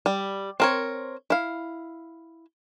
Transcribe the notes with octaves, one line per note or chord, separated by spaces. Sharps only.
G3
C4 A#4 C#5
E4 F5